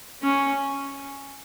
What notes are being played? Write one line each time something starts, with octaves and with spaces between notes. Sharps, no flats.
C#4